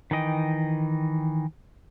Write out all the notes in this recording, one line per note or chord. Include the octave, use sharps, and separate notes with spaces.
D#3 E3 D#5 G5